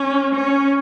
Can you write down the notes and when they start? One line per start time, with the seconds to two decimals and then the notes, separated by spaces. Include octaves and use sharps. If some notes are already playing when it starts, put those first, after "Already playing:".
Already playing: C#4
0.34 C#4